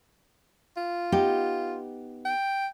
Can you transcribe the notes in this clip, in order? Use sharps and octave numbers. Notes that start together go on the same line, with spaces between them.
F4
B3 D#4 G4
G5